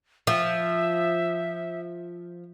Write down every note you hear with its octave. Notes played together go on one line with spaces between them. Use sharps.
F3 E5